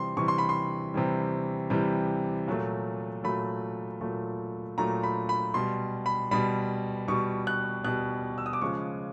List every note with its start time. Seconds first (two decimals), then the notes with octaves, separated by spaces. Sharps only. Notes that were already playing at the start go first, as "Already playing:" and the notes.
Already playing: C3 E3 G3 C6
0.17 C3 E3 G3 C#6
0.28 C6
0.38 B5
0.49 C6
0.94 C3 E3 G3
1.70 C3 E3 G3
2.48 A#2 F#3 A3
3.24 A#2 F#3 A3 B5
4.01 A#2 F#3 A3
4.78 A#2 F#3 A3 A#5
5.03 B5
5.29 B5
5.54 B2 G3 C6
6.06 B5
6.31 B2 G3 B5
7.08 B2 G3 C#6
7.47 F#6
7.84 B2 G3 F#6
8.38 E6
8.46 D#6
8.53 D6
8.61 C#3 F3 G#3 C#6